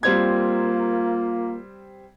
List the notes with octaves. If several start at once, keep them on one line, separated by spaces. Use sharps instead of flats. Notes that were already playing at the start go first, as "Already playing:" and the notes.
G3 A#3 C4 F4 G#6